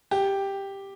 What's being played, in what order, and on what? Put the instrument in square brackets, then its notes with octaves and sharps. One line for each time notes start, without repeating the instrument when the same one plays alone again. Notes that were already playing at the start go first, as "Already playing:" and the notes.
[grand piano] G4